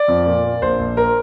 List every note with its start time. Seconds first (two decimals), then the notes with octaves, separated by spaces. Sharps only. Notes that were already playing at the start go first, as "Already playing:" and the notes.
Already playing: D5
0.08 F2
0.26 A#2
0.44 A#3
0.62 A#1 C5
0.79 A#1
0.97 A#4